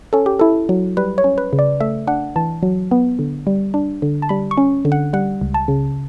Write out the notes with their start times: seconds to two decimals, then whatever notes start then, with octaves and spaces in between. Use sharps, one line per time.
0.13 C#4 A4
0.26 G4
0.39 E4 A4
0.69 F#3
0.97 G3 B4
1.18 C#5
1.24 C#4
1.38 B4
1.53 C#3
1.59 D5
1.80 A3 E5
2.07 D4 F#5
2.36 E3 A5
2.63 F#3
2.91 B3
3.19 D3
3.47 G3
3.74 D4
4.02 D3
4.22 A5
4.29 G3 B5
4.51 C#6
4.57 C#4
4.85 D3
4.92 F#5
5.13 G3 F#5
5.41 C#2
5.54 A5
5.68 C#3